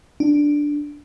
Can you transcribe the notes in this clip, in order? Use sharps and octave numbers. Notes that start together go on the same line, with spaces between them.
D4